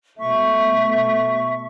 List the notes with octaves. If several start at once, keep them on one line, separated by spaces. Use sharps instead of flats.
B2 A3 E5 C#6